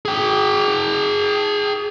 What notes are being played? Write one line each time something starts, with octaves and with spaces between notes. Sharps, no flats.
G#4 G5